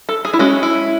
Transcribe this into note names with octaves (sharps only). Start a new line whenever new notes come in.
A4
G#4
E4
G#3 C#4 F#4
E4